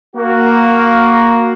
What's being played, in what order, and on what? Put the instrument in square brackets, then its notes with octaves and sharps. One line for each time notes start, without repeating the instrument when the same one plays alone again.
[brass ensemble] A#3 F#4